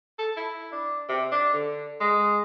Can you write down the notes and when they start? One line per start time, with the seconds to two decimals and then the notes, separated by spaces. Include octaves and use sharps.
0.19 A4
0.37 E4
0.72 D4
1.09 C3
1.32 D4
1.53 D3
2.01 G#3